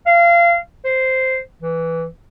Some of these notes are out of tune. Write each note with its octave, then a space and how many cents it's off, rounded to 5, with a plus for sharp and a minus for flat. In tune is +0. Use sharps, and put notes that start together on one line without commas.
F5 -25
C5 -5
E3 +0